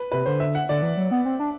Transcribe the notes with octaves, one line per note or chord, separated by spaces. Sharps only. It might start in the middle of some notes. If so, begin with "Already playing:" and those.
Already playing: B4
C3 B4
D3 C5
E5
F#5
D3 D5
E3
F#3
B3
C4
D4